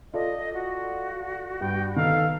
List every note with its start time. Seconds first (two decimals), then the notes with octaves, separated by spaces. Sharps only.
0.14 F4 A4 D5 D#5
0.54 F#4
1.61 G2 G5
1.96 D#3 B3 A4 F5